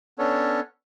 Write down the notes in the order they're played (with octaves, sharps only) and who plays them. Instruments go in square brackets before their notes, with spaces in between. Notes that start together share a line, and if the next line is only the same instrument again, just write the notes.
[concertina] B3 C#4 D4 A4 C#5